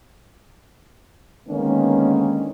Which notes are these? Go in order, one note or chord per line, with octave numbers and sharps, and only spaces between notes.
D3 D#3 G#3 A#3 B3 C#4